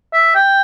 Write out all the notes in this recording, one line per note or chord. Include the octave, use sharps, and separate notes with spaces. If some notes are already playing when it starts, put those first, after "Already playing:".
E5
G5